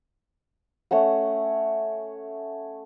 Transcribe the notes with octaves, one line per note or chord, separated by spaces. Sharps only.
A3 C#4 C#5 F#5